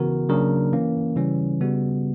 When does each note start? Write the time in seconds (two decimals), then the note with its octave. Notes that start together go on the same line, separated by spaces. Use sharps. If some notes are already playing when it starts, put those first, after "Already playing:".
Already playing: C#3 E3 B3 F#4 A#4
0.29 C#3 F#3 A#3 D4 A#4
0.73 E3 A#3 C#4
1.16 C#3 E3 G3 C#4
1.61 C#3 G3 B3 F#4